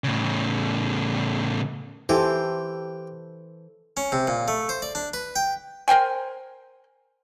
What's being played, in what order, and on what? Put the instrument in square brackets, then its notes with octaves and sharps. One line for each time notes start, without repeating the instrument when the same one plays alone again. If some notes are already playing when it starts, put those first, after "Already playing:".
[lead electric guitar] A2 C#3
[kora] E3 [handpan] E4 A4 C5 [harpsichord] G4
[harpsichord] C#4
C3
A#2
A3
C5
D5
D4
B4
G5
[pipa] A#4 C5 G5 G#5